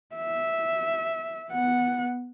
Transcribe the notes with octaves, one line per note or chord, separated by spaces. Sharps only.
E5
B3 F#5